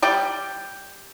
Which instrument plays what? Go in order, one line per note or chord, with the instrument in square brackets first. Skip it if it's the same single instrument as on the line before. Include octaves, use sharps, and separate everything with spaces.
[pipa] G3 D5 G5